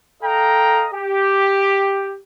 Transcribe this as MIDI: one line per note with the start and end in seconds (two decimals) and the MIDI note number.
0.23 0.87 69
0.23 0.87 75
0.23 0.87 77
0.23 0.87 79
0.23 0.87 82
0.93 2.17 67